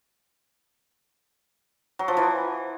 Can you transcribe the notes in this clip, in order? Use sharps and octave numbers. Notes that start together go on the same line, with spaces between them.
F#3
F3
E3